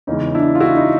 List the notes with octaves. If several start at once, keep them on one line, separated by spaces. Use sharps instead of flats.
E2 C#3 E3 G#3 C#4 D#4
D4 E4
F4
E4 F#4
D#4